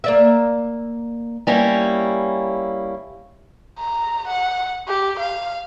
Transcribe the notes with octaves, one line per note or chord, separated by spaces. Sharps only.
A#3 D5 E5
G3 A#3 C#4 E4
A#5
F#5
G4
F5